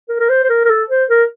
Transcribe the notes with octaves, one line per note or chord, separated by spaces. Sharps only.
A#4
A#4
C5
C5
A#4
A#4
A4
C5
A#4